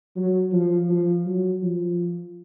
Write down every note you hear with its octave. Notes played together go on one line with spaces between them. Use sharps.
F#3
F3
F3
F#3
F3